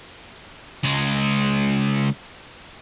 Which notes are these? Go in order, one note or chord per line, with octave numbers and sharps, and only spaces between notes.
C#2 G#3